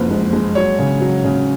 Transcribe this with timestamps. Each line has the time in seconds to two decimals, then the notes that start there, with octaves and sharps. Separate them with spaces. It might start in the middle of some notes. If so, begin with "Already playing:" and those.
Already playing: F#1 F2 B4
0.11 G#3
0.33 G#3
0.55 F#3 C#5
0.79 C#3
1.01 F#3
1.25 C#3